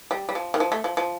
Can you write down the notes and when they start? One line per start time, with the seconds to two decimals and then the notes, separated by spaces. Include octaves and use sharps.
0.11 G3
0.29 G3
0.35 F3
0.54 D#3
0.60 F3
0.72 A3
0.84 F3
0.97 F3